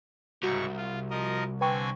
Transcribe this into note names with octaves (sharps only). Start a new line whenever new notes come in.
C2 G#2 C#3 F#4 C#6
F4
F3 A#4 D#5
D3 C4 B4 G5 G#5 C#6